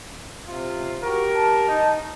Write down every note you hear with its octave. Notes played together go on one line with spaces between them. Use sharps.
C3 F4
F#4 G4 A#4 F#5 C#6
A5
D#4